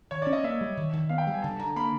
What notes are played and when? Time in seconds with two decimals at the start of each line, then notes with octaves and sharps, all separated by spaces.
0.11 D#3 C#5
0.22 C#4 D5
0.33 D#5
0.44 A#3 E5
0.61 G3
0.77 D#3
0.93 D#3
1.09 B3 F5
1.18 G5
1.27 G3
1.34 G#5
1.42 D3 A5
1.59 D3 A#5
1.76 A#3 B5